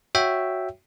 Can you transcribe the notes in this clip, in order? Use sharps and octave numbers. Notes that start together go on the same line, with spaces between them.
F#4 C#5 E5 G5